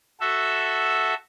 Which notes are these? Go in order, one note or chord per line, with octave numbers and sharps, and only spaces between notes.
F#4 A4 E5